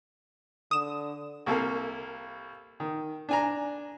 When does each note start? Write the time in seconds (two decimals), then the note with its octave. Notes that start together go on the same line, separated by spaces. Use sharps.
0.71 D3 D#6 E7
1.46 C2 A#3 A4 F5
2.80 D#3
3.29 D4 G#5 A#5